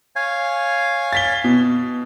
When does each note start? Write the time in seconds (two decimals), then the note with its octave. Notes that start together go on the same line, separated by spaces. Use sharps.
0.16 C#5 F5 G#5
1.13 A6 B6 G7
1.44 B2